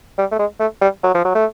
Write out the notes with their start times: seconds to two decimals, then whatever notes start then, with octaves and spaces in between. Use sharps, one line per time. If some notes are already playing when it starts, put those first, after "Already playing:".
0.19 G3
0.32 A3
0.39 G#3
0.60 A3
0.82 G3
1.04 F#3
1.15 F3
1.25 F#3
1.35 A3